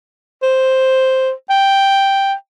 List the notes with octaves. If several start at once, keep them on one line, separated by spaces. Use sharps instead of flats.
C5
G5